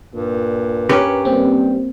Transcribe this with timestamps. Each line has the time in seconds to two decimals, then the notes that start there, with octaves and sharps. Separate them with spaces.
0.14 G2 A#2
0.89 C#4 G4 A#4 B4 C#6
1.25 G3 A#3 C4